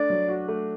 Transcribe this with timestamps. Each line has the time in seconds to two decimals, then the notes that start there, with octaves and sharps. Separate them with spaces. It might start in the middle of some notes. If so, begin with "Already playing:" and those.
Already playing: A3 D4 D5
0.10 F#3
0.28 F#4
0.48 A3